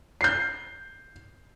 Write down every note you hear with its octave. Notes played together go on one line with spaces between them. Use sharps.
G6 C7